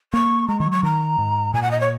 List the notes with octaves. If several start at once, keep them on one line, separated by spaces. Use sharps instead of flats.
A#3 C#6
G#3 A#5
D#3 C#6
F#3
C#6
D#3 A#5
G#2
A#2 G#5
F#5
D#5
C#5